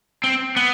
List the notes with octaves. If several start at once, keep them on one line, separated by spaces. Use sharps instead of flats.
C4
B3